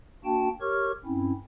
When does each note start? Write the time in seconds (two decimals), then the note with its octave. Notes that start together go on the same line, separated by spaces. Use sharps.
0.24 A#3 D4 F#4 G5 A5
0.61 G4 A#4 C#5 C#6 F6
1.05 G2 C4 C#4 E4